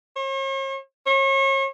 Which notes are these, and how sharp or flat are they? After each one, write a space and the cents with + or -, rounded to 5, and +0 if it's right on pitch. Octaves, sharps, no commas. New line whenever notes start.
C#5 -45
C#5 -35